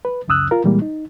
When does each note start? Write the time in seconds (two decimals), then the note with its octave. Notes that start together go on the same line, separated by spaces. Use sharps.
0.05 B4
0.28 C#2 F#2 C#3 D#6 E6 F#6
0.51 F4 A#4
0.64 A#2 E3 G3 G#3 A#3
0.82 D#4